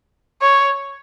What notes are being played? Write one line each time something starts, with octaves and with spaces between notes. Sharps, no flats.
C#5